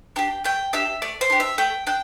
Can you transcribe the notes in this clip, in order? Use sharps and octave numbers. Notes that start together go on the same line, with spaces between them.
D4 G4 G5
A3 G5
D4 G4 E5
A3 D5
C5
D4 G4
E5
A3 G5
D4 G5